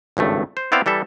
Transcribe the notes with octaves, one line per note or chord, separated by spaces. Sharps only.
G#1 C#2 G2 A3
C5
B3 C4 E4 D5 F5 G5
E3 G3 A4 E5